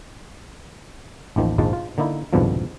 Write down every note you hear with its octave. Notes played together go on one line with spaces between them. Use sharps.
A1 D#2 D#3 F3
A#1 D#2 G#2 F3 G#3 A5
F4
D3 A#3 D#4 E4
C2 F2 G#2 B2 D3 F3